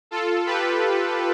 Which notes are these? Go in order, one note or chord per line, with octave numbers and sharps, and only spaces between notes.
F4 A4
G4 B4